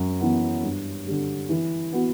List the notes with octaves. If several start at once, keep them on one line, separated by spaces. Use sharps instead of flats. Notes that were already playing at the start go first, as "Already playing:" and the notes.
Already playing: F#2
E3 B3
G2
D3 G3
E3
B3 F#4